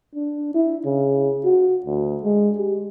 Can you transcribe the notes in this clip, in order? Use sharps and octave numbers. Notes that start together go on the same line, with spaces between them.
D4
E4
C#3
F#4
D2
G#3
G4